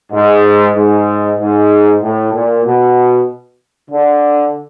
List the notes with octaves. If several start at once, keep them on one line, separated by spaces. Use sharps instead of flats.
G#2
G#2
G#2
A2
A#2
B2
D3